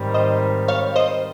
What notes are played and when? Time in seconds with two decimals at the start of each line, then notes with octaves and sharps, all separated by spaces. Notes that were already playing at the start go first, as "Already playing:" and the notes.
Already playing: G#2 D#3 G3 C4
0.14 C5 D#5
0.68 C#5 F5
0.96 C5 D#5